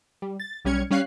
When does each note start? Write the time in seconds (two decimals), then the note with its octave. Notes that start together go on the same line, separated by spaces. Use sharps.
0.22 G3
0.40 A6
0.65 B1 G3 C#4 F6 G#6 C#7
0.91 G3 C#4 C#5 F5 F#6 C7